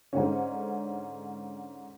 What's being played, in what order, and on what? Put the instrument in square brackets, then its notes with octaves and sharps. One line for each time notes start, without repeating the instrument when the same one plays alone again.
[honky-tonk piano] G#2 D3 C#4